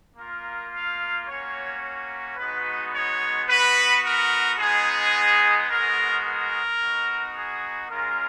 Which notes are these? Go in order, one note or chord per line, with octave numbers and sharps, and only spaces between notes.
A#3 F4 A#4
F5
A#3 C#4 F#4 C#5
G#3 B3 D#4 F#4 B4
C#5
B3 F#4 B4
A#4
G#3 B3 D#4 G#4
G#3 B3 F#4 A#4
A#4
B3 D#4 F#4
G#4
G#3 C#4 F4 A#4